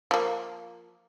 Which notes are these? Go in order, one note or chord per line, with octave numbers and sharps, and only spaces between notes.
F3 A#3